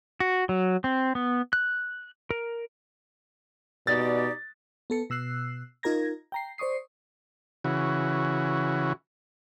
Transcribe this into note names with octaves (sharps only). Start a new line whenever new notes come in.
F#4
F#3
C4
B3
F#6
A#4
B2 D#4 G4 D5 A6
B3 A4 C#7
B2 E6 F#6 C7
D#4 F4 A#4 A#5 G#6 A#6
G5 A#5 C7
C5 D5 C#6 D#6 C7
C#3 E3 F#4